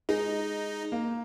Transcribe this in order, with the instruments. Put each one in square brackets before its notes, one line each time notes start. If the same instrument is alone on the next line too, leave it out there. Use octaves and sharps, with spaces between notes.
[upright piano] G#3 [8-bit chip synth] D#4
[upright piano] A#3